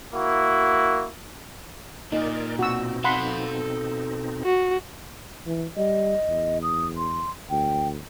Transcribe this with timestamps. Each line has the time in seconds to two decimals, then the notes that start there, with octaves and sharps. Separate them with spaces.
0.15 A#3 E4 F#4
2.12 A#2 D#4 A#4 D5
2.59 B2 C4 D#4 F#4 E6
3.04 A4 F5 F#5 B5 C6
4.45 F#4
5.46 E3
5.77 G3 D#5
6.28 E2
6.63 D#6
6.97 C6
7.50 D2 G5